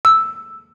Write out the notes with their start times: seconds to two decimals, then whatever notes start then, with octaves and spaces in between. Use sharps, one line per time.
0.05 E6